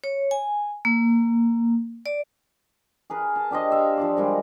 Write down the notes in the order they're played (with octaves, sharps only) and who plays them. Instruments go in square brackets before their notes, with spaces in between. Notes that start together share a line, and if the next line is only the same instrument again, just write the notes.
[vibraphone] C#5
G#5
A#3
D5
[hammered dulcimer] G#4 A#4 B4
A5
D4 G4 C5 D#5
E5 F5
F3 D4 D5
D#3 G3 G#3